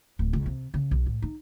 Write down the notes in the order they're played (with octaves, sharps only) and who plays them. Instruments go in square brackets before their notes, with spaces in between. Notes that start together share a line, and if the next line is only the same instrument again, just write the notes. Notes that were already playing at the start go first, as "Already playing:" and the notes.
[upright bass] D1
C#2
C3
C#3
B1
A2
D#4